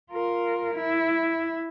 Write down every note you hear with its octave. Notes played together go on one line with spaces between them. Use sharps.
F4 A#4
E4